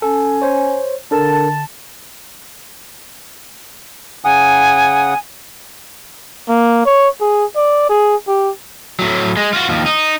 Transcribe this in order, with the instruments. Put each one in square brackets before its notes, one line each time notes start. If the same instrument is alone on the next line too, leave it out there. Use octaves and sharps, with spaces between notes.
[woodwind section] C#4 G#5 [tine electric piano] A4
[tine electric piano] C5 C#5
[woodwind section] D3 A5 [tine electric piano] D4 A4 A#4
[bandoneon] C#3 F#5 D#6 [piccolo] G#5
[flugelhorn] A#3
C#5
G#4
D5
G#4
G4
[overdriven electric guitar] A2 F#3
G#3
F4 F#4
D#2 F3
D#4